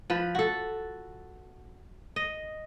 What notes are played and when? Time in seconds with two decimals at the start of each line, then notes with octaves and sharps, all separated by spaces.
0.10 F3 B4
0.35 F#4 A4
2.16 D#5